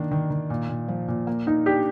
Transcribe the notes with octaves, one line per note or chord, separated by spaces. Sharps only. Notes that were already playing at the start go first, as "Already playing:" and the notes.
Already playing: D#3 A#3 D4
D#3
D#3
A#2
A#2
F3
A#2
A#3
A#3 D#4
D4 G4